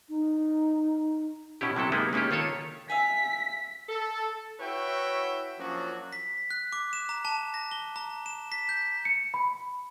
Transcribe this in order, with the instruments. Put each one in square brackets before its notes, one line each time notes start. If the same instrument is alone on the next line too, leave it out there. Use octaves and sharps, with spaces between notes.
[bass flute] D#4
[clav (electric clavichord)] B2 C#4 E4 G4
C3 F#3 E4 A4
G#3 A#3 B3 D#4 E4 G4
G#3 A#3 C#4 D#4 G4
D#3 F4 A4 C#5
[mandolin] E5 F5 G#5 [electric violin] B6
[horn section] A4
E4 F#4 B4 C#5 E5 G5
F3 F#3 A#3 C#4 D4 F#4
[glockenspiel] B6
F#6
D6
E7
A#5
A5
A#6
G7
A#5
E7
B6
G6
[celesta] C#7
B5